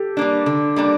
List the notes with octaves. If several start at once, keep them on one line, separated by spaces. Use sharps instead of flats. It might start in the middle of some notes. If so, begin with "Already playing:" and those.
Already playing: G4 A4
G3 A#3 D4
D3
G3 A#3 D4